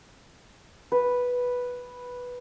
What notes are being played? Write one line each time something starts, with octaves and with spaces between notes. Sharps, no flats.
B4